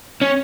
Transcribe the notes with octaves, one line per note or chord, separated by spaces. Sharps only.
C#4